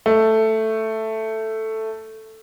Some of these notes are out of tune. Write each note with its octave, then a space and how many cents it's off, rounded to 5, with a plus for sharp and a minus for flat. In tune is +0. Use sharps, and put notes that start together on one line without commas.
A3 +5